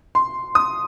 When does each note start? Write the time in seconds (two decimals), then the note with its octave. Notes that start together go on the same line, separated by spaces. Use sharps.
0.15 C6
0.55 D#6